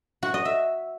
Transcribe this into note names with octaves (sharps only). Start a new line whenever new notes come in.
F#4
D#5
E5